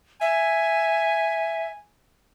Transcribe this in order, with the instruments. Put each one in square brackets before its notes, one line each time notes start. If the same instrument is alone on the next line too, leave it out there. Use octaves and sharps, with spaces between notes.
[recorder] E5 [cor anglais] G#5